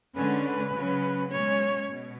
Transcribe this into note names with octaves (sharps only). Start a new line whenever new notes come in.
D3 G#3 C#4 B4
B4
C#3 F#3 C#4
B2 G#3 C#4 C#5
B2